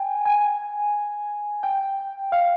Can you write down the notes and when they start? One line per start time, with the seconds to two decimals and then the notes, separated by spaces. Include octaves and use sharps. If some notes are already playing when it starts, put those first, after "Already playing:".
Already playing: G5 G#5
0.25 G#5
1.63 G5
2.32 F5